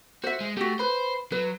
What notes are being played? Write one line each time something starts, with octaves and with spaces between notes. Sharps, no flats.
F#4 C5 E5
G#3
A3 F#4 G4
B4 C5 B5
F#3 B4